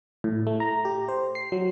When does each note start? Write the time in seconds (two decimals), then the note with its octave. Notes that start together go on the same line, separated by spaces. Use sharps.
0.24 A2
0.47 A3
0.60 A#5
0.85 G4
1.08 C5
1.35 C7
1.52 F#3